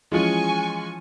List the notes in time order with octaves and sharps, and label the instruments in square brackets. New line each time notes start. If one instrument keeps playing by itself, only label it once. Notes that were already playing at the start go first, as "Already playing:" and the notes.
[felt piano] E3 F3 C#4 [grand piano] G#3 F4 G#4 [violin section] G#5 C#6